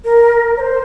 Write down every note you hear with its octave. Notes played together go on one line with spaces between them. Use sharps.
A#4
C#5
C5